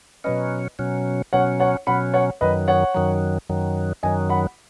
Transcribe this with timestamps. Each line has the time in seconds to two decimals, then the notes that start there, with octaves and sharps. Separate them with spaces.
0.24 B2 F#3 C#4 B4 D#5
0.79 B2 F#3 C#4
1.33 B2 F#3 C#4 C#5 F#5
1.60 C#5 F#5
1.87 B2 F#3 C#4 F#5 B5
2.14 C#5 F#5
2.41 F#2 D#3 F#3 B4 D#5
2.68 C#5 F#5
2.94 F#2 D#3 F#3
3.49 F#2 D#3 F#3
4.03 F#2 D#3 F#3 D#5 G#5
4.30 F#5 B5